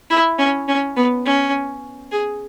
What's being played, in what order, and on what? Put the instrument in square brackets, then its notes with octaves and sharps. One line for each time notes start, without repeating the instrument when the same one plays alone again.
[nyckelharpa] E4
C#4
C#4
B3
C#4
G#4